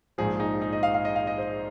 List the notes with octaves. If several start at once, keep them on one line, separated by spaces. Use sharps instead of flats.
A#1 G#2 F3 G#4
D#4
D#4
D#5
F5
F5
D#5
F5
D#5
C5